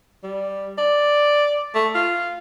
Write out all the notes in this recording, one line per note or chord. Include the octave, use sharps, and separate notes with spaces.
G3
D5
A3
F4